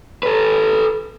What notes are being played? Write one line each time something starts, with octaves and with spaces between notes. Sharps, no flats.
A4 B4